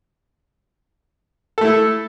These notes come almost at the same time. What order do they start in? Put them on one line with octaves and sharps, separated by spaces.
A4 A3 E4